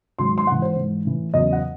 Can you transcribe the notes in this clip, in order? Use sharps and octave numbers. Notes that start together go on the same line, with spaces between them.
G#2 D#3 F#3 C6
C6
G#2 E3 F#5
C5
G#2 E3
A2 E3
E2 C#3 F#3 D#5
F#5